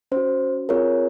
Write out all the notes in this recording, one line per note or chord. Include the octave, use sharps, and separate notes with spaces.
C#4 F#4 C5
C4 F4 G#4 A#4 C#5